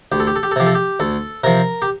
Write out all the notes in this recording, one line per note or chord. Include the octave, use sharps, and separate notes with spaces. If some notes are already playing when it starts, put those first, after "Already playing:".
D2 G4
A4
G4
A4
G4
A4
C3 F3 G4
A4
G4
D2 A4
C3 F3 A#4
G4